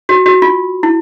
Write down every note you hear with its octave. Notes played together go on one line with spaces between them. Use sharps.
F#4
F#4
F4
E4